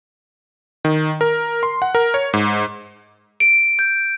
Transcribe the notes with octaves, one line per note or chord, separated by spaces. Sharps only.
D#3
A#4
C6
F#5
A#4
C#5
G#2
D7
G6